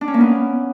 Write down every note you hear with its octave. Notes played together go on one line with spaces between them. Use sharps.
D4
C#4
A#3
B3